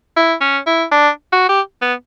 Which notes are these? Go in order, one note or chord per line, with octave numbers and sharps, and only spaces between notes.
E4
C#4
E4
D4
F#4
G4
B3